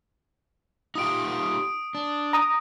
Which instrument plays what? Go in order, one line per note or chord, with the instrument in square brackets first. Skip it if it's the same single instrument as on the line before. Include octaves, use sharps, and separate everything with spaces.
[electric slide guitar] D#4 F4 G4 [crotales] D#6 D7
[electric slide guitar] D4
[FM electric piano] A#5 D#6